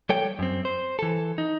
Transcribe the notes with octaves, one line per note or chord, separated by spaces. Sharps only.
G3 A4 C#5 G5
F#2 C4
C5
E3 A4
D#4